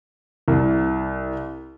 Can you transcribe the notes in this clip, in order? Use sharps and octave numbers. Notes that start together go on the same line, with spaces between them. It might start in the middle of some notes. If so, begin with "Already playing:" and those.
C2